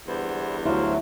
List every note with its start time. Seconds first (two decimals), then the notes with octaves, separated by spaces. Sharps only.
0.08 E2 D3 G3 B3 E4 C5
0.65 D2 F#3 E4 C5 F5 C6